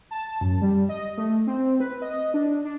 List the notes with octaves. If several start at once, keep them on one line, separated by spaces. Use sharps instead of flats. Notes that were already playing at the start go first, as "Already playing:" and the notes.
A5
F#2
G3
D#5
A3
C4
B4
D#5
D4
D4